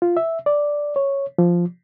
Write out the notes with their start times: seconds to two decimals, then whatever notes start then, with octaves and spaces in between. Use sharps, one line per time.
0.02 F4
0.17 E5
0.46 D5
0.96 C#5
1.38 F3